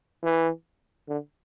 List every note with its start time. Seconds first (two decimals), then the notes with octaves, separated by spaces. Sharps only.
0.24 E3
1.09 D3